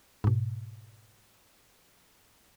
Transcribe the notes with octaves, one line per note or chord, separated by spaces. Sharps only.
G#2 B2